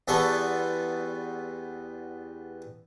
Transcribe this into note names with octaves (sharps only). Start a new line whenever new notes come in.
E2 G3 B3 A4 C6 C#6